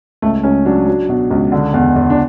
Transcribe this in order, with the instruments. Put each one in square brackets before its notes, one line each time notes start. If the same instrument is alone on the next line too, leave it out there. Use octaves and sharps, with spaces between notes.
[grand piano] C#2 A3
C#2 C#4
F#3 D4
F#3
B2
C#2
D3
E2
E2
D4